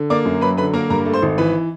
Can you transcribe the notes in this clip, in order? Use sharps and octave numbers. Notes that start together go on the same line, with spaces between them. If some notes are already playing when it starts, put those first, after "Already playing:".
Already playing: D3
A#3 D5 D6
F#2
F#3 B4 B5
D3 B4 B5
A#3 A#4 A#5
G2 A#4 A#5
A3
C5 C6
G#1
E3 B4 B5